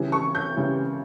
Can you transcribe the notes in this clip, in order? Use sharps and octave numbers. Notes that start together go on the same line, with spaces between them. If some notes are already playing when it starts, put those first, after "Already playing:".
Already playing: C#3 E3 G3
C#6
G6
C#3 E3 G3